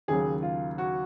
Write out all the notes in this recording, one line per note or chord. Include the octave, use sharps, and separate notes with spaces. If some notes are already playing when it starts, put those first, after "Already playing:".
D#2 C#3 F#3 G#4
F4
F#4